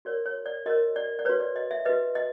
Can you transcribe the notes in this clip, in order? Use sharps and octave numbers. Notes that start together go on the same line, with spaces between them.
F#4 A#4 C#5 D5
C#5
D5
F#4 A#4 C#5 D#5
D5
D5
F#4 B4 C#5
D5
D#5
E5
F#4 B4 D#5
D#5